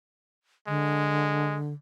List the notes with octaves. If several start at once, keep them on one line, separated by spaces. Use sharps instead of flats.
D3 G#3